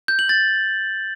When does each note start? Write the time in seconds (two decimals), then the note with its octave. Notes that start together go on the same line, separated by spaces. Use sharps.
0.08 G6
0.19 F#7
0.29 A6